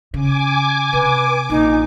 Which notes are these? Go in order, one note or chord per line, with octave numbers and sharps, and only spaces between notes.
C#3 G#5 D6
C3 B4
A#1 D#4